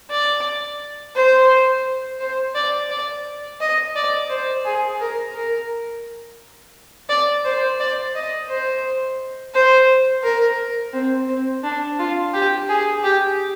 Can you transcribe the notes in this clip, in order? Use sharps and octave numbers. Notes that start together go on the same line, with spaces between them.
D5
C5
C5
D5
D5
D#5
D5
C5
G#4
A#4
A#4
D5
C5
D5
D#5
C5
C5
A#4
C4
C4
D4
F4
G4
G#4
G4